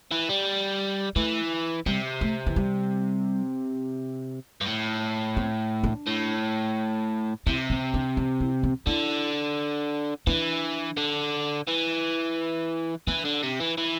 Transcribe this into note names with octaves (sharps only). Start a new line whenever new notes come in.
E3
G3
E3 A3
C3 G3
A3
E3
G3
G2
A2
C4
D4
A2
C3 E4
C4
D4
D4
E4
C4
D3 E4
E3 D4
D3
E3
E3 D4
D3
C3
E3
E3